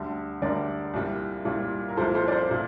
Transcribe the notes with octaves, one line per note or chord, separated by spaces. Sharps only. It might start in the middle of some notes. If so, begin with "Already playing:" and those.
Already playing: D2 D3 G3
D2 D3 G3 A#4 D5
C2 A#2 G3
C2 A#2 G3
A#4
C2 A#2 F3 A4 C5
A4 C5
D5
A4 C5
A#2